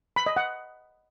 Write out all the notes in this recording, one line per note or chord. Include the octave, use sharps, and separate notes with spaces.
B5
D#5
F#5